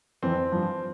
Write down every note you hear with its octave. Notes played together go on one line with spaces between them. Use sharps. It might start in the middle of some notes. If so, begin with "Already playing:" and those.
F2 E3 C4
G2 F3